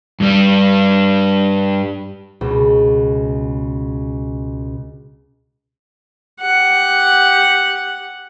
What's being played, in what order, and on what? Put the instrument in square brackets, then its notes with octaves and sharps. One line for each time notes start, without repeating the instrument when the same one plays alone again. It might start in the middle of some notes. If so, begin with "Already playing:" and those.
[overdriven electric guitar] G2 G3
[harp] C#2 B2
[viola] G4 F#5